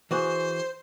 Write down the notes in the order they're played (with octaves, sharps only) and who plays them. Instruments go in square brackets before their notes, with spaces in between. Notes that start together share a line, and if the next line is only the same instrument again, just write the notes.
[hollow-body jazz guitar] E3 F#4 G#4 [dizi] C5